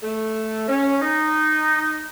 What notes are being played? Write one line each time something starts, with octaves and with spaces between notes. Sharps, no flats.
A3
C#4
D#4